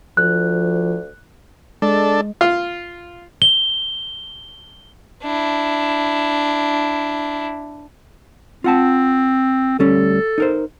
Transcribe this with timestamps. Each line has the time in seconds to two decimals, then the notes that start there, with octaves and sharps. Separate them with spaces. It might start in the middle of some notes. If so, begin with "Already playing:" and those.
0.17 D2 F3 F#6
1.82 G#3 D4 A4
2.41 F4
3.42 G7
5.23 D4 E4
8.64 C4 F4 F#5 A5
9.79 D2 G3 C#4 A4
10.38 D#4 A#4 C5